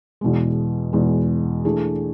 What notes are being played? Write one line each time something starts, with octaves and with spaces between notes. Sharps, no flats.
E2 B2 G#3
E2 B2 G#3
E3 A3 D4 G#4